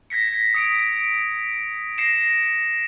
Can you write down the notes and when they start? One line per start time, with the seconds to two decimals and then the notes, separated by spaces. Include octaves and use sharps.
0.10 G#6 A#6 B6 C#7
0.54 D#6 C#7 D7
1.98 A#6 C7 C#7 E7